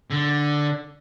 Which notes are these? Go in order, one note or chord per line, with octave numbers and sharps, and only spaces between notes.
D3